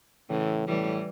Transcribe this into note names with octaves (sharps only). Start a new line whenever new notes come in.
A2 C#3 E3
A2 E3 G3